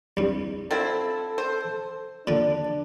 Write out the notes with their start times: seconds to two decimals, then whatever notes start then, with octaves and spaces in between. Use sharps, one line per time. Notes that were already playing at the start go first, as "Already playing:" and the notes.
0.17 C2 G2
0.71 F3 C4 E4 A4
1.38 C5
2.27 A#2 D3 D4